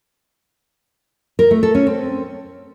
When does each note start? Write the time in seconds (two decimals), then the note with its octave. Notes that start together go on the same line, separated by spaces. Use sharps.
1.39 A#4
1.51 A3
1.63 A4
1.75 C#4
1.87 C4